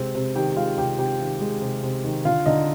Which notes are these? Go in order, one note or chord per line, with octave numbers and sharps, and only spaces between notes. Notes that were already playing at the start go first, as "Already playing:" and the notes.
Already playing: C3 G#3 C4 C5
C3
D#3 G4 G5
G#3 F4 F5
C3 G4 G5
C3 G4 G5
D#3
G#3
C3
C3
D#3
D3 F4 F5
D3 D#4 D#5